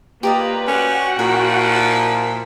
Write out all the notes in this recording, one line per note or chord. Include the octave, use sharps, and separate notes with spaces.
A#3 F4 G4 B4 D5 D#5 A#5
C#4 F#4 F#5 G5
A#2 F3 E4 G#4